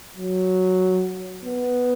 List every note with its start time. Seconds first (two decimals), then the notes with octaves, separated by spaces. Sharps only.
0.17 F#3
1.45 B3